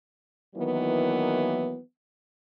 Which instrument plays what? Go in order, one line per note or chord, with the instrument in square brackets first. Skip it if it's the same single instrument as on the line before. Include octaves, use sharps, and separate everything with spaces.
[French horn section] D#3 E3 F#3 A#3 B3 E4